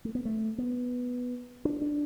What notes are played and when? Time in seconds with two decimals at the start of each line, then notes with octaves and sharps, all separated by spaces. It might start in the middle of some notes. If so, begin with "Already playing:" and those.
0.05 A3
0.15 B3
0.25 A3
0.58 B3
1.65 D4
1.81 D4